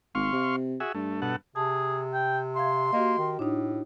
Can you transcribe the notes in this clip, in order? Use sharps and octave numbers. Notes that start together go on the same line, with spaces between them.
G#1 F5 C6 C#6
C3
F#4 G#4 E5
G2 A3
B2 A4 F#5
C3 G#4 A5
G5
E5 F5 C6 G#6
A#3 F#4 G4 D#5
D#3
A2 D4 D#4